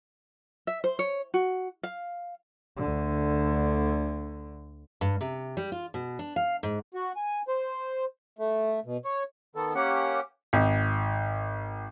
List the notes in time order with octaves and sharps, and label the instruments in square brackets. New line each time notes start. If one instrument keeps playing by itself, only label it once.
[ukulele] E5
C5
C#5
F#4
F5
[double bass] D2 D3
[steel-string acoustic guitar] G2
C3
G3
F4
B2
D4
F5
G#2
[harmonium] F#4
G#5
C5
A3
B2
C#5
[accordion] D#3 B3 A4
A#3 C#4 G4 F#5
[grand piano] G#1